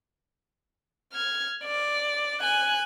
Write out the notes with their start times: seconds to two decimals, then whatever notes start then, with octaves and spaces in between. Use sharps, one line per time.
1.13 F6 G#6
1.65 D5
2.41 G#5 F#6